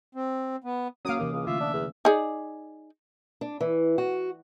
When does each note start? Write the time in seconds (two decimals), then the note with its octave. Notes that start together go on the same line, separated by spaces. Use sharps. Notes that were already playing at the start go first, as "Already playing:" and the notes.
0.15 C4
0.64 B3
1.05 F#3 A#3 C#4 F5 D6 D#6
1.20 D#2 C3 E3 A#3
1.33 C#2
1.47 D3 A3 F4 E5
1.61 D4
1.74 E2
2.05 D#4 G#4 D5
3.41 D4
3.61 E3
3.98 F#4